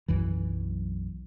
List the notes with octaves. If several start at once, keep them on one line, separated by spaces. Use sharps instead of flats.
B1 F#2 E3